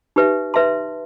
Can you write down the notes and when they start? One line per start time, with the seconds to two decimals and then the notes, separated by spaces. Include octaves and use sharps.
0.16 D#4 G4 B4 E5
0.54 B4 E5 A5 C6